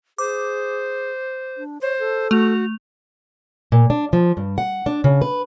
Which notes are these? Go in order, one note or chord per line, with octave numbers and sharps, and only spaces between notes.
G#4 C5 D6
D4
C5 C#5
A4
A3 F#4 F7
A#2
D4
F3
G2
F#5
D4
C#3
B4